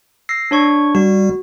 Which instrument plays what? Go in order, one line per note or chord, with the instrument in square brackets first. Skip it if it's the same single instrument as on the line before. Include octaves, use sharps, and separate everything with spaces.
[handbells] E6 A#6 C7
D4 C#5 C#6
[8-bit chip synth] G3 [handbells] F#4